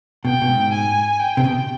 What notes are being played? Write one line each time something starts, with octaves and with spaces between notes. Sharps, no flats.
B2 G5
B2
G#2
G#5
G5
C3
B2